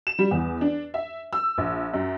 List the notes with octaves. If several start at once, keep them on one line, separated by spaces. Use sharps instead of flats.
E7
G3
E2
D4
E5
E6
A#1
F#2